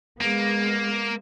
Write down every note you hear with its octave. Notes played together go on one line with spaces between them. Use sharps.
G#3 A#3 B3